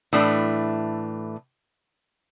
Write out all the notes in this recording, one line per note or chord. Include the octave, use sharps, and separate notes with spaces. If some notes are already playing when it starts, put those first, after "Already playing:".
A2 E3 A3 D4